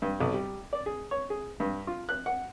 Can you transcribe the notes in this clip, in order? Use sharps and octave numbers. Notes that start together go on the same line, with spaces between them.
G2
B1
G3
D5
G#4
C#5
G#4
G2
F4
F#6
F#5